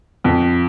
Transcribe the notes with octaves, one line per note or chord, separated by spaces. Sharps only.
F2